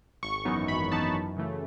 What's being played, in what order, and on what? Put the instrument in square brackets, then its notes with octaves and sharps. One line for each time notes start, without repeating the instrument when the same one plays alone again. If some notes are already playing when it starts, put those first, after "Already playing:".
[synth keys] G#1 C#6
F#2 E3 B3 D#4
G#1 B5
F#2 E3 B3 D#4 A5
F#2
C#3 E3 A3